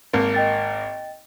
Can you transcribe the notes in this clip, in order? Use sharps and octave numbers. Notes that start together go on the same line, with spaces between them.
G#1 A#3
D#5 G5 A6